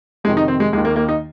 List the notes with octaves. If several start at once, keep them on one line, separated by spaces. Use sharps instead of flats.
F2 C3 D#3 G#3
D#4
C4
G#3
D#2 D#3 G#3
A#3
A#3
D#4